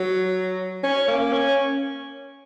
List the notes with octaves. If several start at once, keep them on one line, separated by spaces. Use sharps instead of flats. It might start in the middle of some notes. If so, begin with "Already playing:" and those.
Already playing: F#3
C#4
A#3
C#4